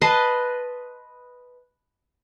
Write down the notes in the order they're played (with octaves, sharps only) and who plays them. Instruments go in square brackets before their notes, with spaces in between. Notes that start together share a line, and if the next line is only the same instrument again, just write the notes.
[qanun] B4 D#5 A5 C6